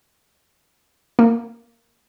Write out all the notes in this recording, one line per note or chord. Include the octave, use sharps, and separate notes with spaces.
A#3